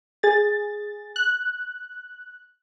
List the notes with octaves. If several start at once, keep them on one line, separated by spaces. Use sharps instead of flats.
G#4 A6
F#6